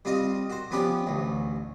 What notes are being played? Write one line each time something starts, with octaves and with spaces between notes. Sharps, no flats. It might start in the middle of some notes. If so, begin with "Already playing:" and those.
G3 C4 F4 D#5
F#4 C5
F3 B3 C#4 G4 D5
A1 D2